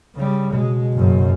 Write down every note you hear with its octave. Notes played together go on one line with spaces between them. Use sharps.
C#3 G3
B2 G#3
F#1 F#2